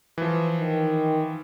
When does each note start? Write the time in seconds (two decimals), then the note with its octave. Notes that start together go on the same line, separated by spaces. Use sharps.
0.18 E3 F3
0.59 D#3